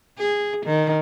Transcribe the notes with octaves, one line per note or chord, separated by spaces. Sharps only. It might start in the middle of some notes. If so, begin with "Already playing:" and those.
G#4
D#3